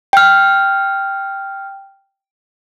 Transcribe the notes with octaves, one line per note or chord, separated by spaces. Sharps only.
G5 F6